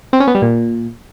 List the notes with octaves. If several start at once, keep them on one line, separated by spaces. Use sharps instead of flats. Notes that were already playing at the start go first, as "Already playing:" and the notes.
C4
C#4
B3
G3
A#2